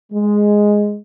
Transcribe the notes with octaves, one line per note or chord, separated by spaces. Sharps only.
G#3